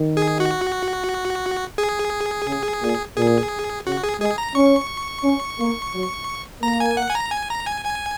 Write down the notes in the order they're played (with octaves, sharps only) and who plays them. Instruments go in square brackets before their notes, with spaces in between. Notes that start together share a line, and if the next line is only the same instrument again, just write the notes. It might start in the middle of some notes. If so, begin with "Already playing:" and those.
Already playing: [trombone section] D#3
[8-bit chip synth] G#4
F#4
G#4
[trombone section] C#3
A#2
[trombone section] A#2 [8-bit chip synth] G#4
[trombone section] C#3 [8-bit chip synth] F#4
[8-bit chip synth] G#4
[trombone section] G#3 [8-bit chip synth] G#4
[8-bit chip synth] A#5
[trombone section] C#4 [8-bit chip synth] C#6
[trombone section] C#4
A#3
F#3
[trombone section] A#3 [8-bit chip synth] A#5
[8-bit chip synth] G#5
F#5
G#5
A#5
G#5
A#5
G#5
G#5